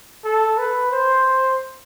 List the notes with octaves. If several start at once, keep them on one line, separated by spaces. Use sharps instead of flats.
A4
B4
C5